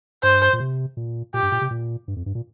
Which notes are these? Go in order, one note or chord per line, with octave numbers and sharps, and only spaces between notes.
G2 C5
A#2
C3
A#2
A#2 G4
G2
A#2
C3
A#2
G2
F2
G2
A#2